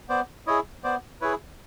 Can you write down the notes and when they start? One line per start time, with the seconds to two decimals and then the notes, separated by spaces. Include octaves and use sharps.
0.09 B3 C5 D5
0.47 E4 G#4 C#5 D#5
0.84 B3 C5 D5
1.21 E4 G#4 B4 C#5